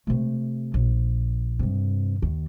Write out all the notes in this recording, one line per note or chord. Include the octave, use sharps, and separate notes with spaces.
C3 A3
A#1
G2 C3
D#2 D#3